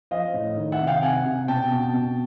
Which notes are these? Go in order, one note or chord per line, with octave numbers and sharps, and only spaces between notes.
F3 D#5 F5
A2
D#3
E5 F#5
C3
F5 G5
C3 F#5 G#5
C3
B2 G5 A5
B2
B2